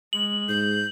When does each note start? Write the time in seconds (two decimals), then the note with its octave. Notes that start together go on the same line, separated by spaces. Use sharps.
0.13 G#3 F#7
0.49 G#2 G6